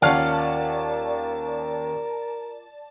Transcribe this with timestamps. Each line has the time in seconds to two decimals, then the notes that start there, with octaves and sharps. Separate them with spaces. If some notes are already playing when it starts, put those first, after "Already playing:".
0.02 D#2 C#4 F4 A#4 D5 F5 F#5 A5